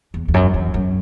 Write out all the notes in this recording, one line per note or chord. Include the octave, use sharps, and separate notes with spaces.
E2
E2
F#2
E2
F#2